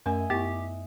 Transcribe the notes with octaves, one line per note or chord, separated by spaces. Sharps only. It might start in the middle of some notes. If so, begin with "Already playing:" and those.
F#2 A3 A#4 D#5 E5 G#5
F#2 B3 E4 G4